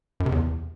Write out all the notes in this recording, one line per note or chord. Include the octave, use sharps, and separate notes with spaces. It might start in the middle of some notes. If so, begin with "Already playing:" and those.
F#2
C3
E2